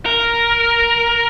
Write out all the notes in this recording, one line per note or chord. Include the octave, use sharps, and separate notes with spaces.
A#4